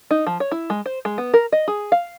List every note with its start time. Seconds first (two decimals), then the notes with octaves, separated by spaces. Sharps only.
0.11 D#4
0.27 F3
0.40 C#5
0.52 E4
0.70 G#3
0.86 C5
1.05 G#3
1.18 B3
1.34 A#4
1.52 D#5
1.68 G#4
1.92 F5